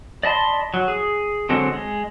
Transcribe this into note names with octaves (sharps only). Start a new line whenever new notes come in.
D5 D#5 A5 B5 C6
F#3
G#4
D3 F#3 G#3 C4 A4
G#3